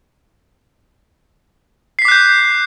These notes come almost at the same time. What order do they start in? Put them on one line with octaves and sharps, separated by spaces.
C7 B6 D6 F#6 G6